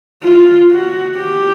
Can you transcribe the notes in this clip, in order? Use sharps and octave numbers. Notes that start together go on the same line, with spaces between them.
F4
F#4
G4